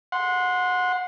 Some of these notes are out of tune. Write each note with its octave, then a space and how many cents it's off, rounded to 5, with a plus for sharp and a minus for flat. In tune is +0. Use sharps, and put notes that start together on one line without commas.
F#5 -25 C6 +0